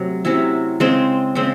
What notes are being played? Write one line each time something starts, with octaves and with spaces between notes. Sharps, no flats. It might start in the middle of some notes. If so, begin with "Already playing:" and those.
Already playing: C3 F#3 A3
C3 F#3 C#4 E4
C#3 G#3 C4
C#3 G#3 C4